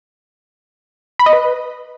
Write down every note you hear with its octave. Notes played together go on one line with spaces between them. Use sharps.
B5
D#5
B4